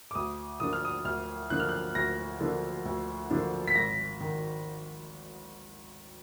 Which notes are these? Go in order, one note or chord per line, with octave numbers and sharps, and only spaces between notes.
D6
D2 D#6
D3 F3 A#3 D4 D#6
F6
D#6
D2 F6
D3 F3 A#3 D4 F#6
F6
F#6
D2 A#6
D3 F3 A#3 D4
D2
D3 F3 A#3 D4
B6
G#1 A#6
D#3